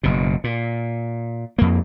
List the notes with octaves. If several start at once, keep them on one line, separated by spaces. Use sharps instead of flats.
F#1 B2
A#2
F2 A#3